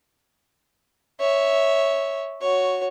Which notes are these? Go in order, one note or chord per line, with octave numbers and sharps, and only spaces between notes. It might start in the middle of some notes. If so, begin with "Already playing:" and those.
C#5 E5
F#4 C#5